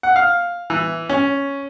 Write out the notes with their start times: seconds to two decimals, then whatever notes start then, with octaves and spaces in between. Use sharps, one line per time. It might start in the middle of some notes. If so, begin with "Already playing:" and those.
0.03 F#5
0.16 F5
0.70 E3
1.09 C#4